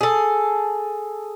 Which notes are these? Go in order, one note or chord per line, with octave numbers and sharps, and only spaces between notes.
G#4 A4